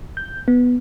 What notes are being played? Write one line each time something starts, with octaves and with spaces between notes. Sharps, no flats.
G6
B3